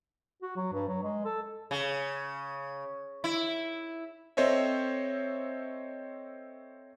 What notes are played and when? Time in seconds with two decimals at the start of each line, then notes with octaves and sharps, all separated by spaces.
0.42 F#4
0.56 F#3
0.73 G2
0.88 F#3
1.03 G#3
1.25 A4
1.71 C#3
3.24 E4
4.37 C4 A4 C5 C#5 D#5 E5